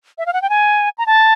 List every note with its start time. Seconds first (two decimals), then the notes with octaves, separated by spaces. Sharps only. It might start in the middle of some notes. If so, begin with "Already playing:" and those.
0.18 E5
0.26 F5
0.33 F#5
0.42 G5
0.50 G#5
0.98 A#5
1.06 A5